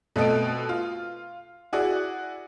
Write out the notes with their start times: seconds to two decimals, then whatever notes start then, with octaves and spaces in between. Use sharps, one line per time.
0.16 B2 A3 C4 A4 D#5 D7
0.69 F4
1.73 E4 F#4 G#4 D5